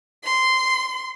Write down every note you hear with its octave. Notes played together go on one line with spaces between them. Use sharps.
C6